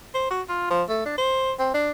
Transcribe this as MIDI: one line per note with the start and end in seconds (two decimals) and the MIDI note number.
0.14 0.30 72
0.30 0.42 66
0.49 0.69 65
0.70 0.83 53
0.89 1.02 57
1.05 1.16 62
1.18 1.52 72
1.59 1.72 60
1.74 1.91 62